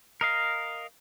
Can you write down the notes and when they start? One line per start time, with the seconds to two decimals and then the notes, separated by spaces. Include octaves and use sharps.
0.21 A#4 D#5 F5